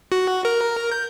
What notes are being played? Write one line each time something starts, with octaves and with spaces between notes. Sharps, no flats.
F#4
A#4
G6